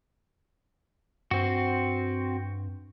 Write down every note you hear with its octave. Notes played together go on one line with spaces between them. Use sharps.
G2 C4 F#4